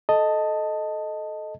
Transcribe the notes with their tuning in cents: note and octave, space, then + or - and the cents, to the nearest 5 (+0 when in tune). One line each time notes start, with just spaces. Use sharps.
A4 -15 D#5 +0 A5 +10